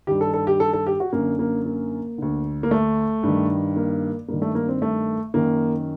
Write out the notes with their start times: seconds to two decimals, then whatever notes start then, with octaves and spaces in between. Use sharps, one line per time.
0.07 G2 D#3 G4
0.21 A4
0.34 A4
0.47 G4
0.60 A4
0.73 A4
0.87 G4
1.00 F#4
1.13 F#2 D3 A#3
1.39 A#3
1.65 A#3
2.18 D2 D3
2.63 A#3
2.71 A3
3.23 G2 D#3
3.76 A#3
4.28 G2 D#3 A#3
4.42 A3
4.55 A#3
4.68 C4
4.82 A3
5.34 F#2 D#3 A#3